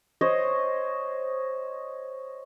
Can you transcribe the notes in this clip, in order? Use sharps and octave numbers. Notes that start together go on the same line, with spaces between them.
C5 C#5 D#5